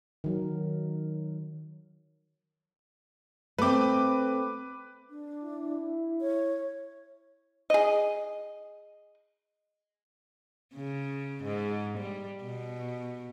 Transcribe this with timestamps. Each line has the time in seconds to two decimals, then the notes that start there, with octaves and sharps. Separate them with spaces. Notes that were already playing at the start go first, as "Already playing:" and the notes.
0.24 D#3 F#3 A#4
3.58 A3 C4 B4 D6
5.10 D4
5.44 E4
6.21 C#5
7.70 G#4 D#5
10.74 C#3
11.44 G#2
11.98 G3
12.44 B2